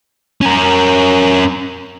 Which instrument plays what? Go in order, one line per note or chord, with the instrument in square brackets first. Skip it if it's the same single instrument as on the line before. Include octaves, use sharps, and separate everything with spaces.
[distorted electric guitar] C#4 A#4